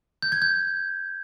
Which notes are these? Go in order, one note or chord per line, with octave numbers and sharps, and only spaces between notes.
G6
G#6
G6